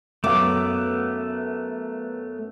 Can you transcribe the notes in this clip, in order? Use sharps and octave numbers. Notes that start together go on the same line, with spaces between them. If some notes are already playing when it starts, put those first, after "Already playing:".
F#2 F#3 A3 B3 F5 D6